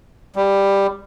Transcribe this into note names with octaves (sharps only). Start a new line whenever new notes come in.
G3